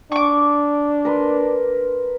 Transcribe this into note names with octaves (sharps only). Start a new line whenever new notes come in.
D4 C#6 D6
A#4 B4 C6